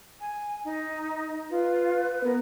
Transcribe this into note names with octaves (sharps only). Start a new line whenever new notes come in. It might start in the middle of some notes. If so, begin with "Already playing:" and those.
G#5
D#4
F4 B4
B3 A#4